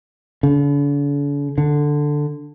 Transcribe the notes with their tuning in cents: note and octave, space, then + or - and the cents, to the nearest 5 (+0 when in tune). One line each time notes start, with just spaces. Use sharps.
D3 -45
D3 +5